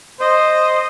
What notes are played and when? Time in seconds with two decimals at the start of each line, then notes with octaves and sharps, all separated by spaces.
0.21 C5 D#5